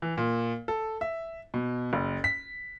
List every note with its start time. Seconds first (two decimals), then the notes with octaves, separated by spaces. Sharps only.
0.02 E3
0.18 A#2
0.68 A4
1.01 E5
1.54 B2
1.93 F#1
2.24 B6